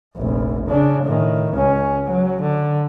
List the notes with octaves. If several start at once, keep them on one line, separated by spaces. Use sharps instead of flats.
F1 A#1
C#3 D4
A2 D#3
C#2 C#4
F#3
D3